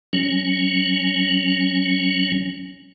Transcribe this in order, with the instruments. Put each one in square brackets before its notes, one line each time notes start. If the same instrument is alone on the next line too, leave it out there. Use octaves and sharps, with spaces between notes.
[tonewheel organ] F#3 C#4